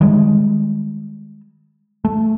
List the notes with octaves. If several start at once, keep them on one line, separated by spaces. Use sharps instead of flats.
D#3 G3 G#3
A3